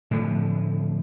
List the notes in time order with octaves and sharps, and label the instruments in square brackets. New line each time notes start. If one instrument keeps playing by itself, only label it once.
[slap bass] A2 D3 F3